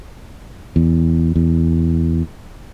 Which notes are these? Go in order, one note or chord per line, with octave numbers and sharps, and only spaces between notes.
E2
E2